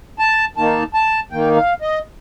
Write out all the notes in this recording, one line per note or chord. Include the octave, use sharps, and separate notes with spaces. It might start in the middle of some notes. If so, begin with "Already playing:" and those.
A5
D#3 A#3 D#4 A5
A5
D#3 A#3 D#4 G5
F5
D#5